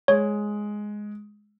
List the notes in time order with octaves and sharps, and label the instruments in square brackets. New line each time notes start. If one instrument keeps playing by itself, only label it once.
[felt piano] G#3 [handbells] C#5